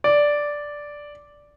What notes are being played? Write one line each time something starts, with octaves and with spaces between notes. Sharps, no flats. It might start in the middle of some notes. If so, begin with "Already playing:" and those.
D5